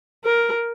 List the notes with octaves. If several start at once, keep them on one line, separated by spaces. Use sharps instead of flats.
A#4